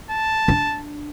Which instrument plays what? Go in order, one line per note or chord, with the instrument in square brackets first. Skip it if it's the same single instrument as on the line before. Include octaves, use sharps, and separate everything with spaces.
[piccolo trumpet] A5
[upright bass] D4